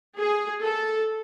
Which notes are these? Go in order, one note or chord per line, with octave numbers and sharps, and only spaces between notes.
G#4
A4